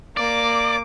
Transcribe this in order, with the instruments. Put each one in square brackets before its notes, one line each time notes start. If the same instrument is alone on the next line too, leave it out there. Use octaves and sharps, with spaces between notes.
[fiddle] A#3 D6 [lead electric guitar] D5